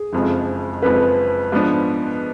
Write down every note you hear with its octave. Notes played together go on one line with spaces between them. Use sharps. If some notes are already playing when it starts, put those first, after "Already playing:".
Already playing: G#4
F#1 F2 F3 G#3
F#1 F2 F3 G#3 B4
G#2 F3 B3 D4